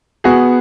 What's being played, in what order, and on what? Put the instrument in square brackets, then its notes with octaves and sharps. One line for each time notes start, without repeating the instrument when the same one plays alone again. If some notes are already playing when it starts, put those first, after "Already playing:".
[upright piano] B3 [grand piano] F#4 G#4